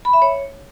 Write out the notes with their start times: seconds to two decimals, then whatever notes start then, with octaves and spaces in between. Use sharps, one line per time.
0.05 B5
0.13 E5
0.22 C#5